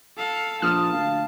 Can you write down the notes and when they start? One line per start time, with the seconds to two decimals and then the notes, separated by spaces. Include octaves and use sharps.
0.18 A4 F5
0.62 A#1 F4 A5 D#6 F6
0.93 D2 F5